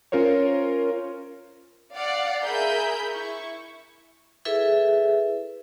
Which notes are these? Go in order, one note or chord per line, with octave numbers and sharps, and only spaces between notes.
C#4 F4 A#4 C5 C#5
D5 F5 F#5
G#4 A#4 E5 B5 G6
E4 C#6
E4 G#4 A4 B4 E5